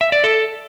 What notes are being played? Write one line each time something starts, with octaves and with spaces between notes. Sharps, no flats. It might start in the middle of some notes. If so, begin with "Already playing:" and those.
E5
D5
A4